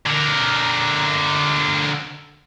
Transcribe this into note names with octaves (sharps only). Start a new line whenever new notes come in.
D3 A#4